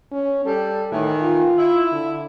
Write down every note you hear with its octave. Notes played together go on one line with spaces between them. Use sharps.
C#4
G3 A4
A2 D#3 E3
F4
E4
D3